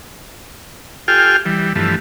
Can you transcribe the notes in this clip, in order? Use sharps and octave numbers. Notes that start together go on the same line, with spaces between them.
F4 G4 A4 G5 G#5 F6
E3 G3
G2 E3 F3 A3